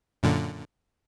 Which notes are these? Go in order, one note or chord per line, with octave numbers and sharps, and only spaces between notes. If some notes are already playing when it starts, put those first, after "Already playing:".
F#2 A#2 D3